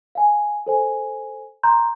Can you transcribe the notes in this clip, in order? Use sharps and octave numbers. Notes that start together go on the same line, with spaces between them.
F5 G#5
A4 C5 G#5
A#5 C6 G6